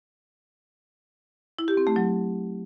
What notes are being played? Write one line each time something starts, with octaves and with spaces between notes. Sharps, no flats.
E4
G4
C4
A3
F#3